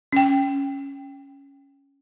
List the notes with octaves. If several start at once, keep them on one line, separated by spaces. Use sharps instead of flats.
C#4 G5